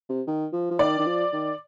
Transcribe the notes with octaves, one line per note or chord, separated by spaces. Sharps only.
C3
D#3
F3
F3
D#3 D5
D#3
F3
D#3